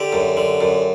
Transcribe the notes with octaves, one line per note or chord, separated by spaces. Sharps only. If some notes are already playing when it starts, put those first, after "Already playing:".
Already playing: D3 G4
F#2
D3
F#2